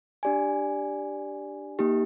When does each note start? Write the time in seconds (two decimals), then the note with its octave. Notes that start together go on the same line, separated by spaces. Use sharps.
0.23 D4 G4 D5 G#5
1.79 A#3 D#4 G4